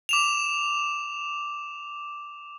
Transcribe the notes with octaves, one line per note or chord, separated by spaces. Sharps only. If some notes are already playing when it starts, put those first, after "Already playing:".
D6 E7 F7